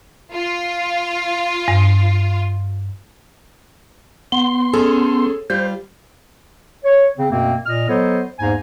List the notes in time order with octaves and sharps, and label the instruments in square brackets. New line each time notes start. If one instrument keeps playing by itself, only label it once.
[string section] F4
[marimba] G2
[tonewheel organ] B3 C6
[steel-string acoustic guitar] C#4 [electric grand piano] G#4 A4
[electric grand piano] G3 [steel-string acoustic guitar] F4 [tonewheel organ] C5
[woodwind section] C#5
C#3 C4
F#2 B2 A3 A#3 C4
A#2 D#5 F6
F#3 B3 A4 C5 C#5 D#5
E2 G#2 A#3 C5 G#5 A#5